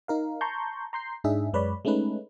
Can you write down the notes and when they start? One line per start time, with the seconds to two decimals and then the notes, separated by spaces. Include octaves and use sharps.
0.08 D#4 A#4 F5
0.41 A5 A#5 C6 C#6 G6
0.93 A#5 C6 G6 C7
1.24 G#2 D4 D#4 G#4 E5
1.53 F#2 G#3 B4 C#5 D5 B5
1.85 G#3 A3 C#4 D#4 B4